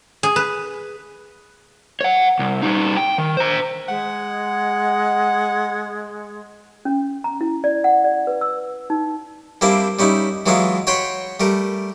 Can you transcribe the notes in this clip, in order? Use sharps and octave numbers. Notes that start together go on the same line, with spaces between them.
G#4
B4
C#5 F#5
C2
G3 D#4
G5
D#3
C5 A#5
G#3 F#5
C#4
A#5
E4
D5
F#5
D5
B4
E6
D#4
G3 A#3 C4 D4 E4
G3 C#4 D#4 E4
E3 F#3 G#3 B3 E4 F4
F#4 C#5 G5 B5 C6
G3 A3 A#4